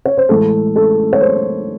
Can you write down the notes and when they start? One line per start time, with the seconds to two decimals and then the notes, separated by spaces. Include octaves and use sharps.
0.05 C#5
0.17 C5
0.29 A2 E3 G#3 A4
0.76 A4
1.13 C#5
1.21 C5